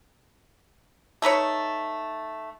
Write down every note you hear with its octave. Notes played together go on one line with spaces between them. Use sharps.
A3 D#4 B4 C#5